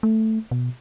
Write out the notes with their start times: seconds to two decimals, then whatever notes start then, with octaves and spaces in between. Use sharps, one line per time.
0.03 A3
0.51 B2